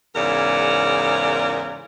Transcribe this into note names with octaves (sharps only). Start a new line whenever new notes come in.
E2 G#2 C#3 A#4 D5